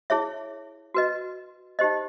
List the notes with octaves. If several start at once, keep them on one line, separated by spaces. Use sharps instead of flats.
E4 G#4 C#5 E5
F#4 B4 D#5
D#4 G4 C5 D#5